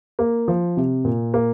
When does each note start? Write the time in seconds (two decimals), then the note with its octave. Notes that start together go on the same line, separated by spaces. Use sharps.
0.19 A#3
0.48 F3
0.77 C3
1.05 A#2
1.34 A#3